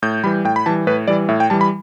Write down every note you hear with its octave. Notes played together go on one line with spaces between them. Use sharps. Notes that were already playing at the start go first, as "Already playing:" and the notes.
A2 G6
E3 G3 B5
A2 G5
B5
E3 G3 A5
A2 B4
E3 G3 D5
A2 E5
G5
E3 G3 A5
B5